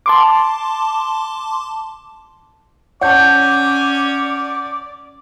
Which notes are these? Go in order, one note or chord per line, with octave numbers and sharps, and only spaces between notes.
A5 C6 D6
C#4 C#5 D5 F#5 A5 G6